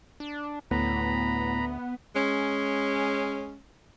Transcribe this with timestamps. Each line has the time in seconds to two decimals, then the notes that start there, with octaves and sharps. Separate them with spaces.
0.20 D4
0.71 D2 A2 B3 A#5 B5
2.16 G#3 C#4